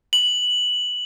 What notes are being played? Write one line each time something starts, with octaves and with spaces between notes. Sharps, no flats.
F#7